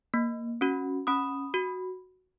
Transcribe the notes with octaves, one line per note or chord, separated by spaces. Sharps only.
A#3
C#4 F#4
C#4 B5 D#6
F#4